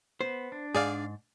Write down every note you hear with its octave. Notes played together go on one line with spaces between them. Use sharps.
B3 C5
D4
G#2 G#4 D5 F5